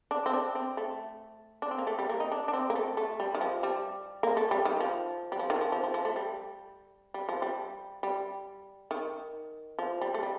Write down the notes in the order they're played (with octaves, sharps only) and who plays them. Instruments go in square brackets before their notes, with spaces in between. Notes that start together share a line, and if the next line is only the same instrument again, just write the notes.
[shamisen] D4
C4
D4
C4
A3
D4
C4
A#3
A3
G3
A#3
D#4
D4
D4
C4
A#3
A3
A3
G3
D#3
F3
G3
A#3
A3
G3
D#3
F3
G3
F3
D#3
F3
F3
F3
F3
A3
G3
G3
F3
G3
G3
D#3
F3
G3
A3
G3